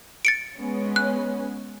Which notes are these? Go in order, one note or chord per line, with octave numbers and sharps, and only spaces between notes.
A6 C#7 D7
G#3 B3 C#4
F#6